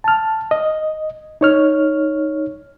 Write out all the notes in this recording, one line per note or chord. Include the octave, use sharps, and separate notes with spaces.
A5 F6
D#5
D#4 C#5 F6